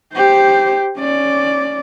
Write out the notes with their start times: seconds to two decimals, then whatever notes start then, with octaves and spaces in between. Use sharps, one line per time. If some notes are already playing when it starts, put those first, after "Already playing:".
0.15 G4 C5
0.98 C#4 D5